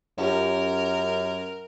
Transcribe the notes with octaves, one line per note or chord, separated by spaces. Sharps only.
F#2 C#4 F4 G4 A#4